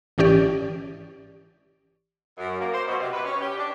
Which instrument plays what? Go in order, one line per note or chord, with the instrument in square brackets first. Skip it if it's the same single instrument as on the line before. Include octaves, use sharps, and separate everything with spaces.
[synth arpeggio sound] G#1 E3 C#4 G4 D5
[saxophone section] F#2
A#3
C5
B2
C3
B4
C#4
G4
D4